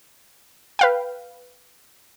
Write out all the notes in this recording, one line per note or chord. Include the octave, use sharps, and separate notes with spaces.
B4 F5 G5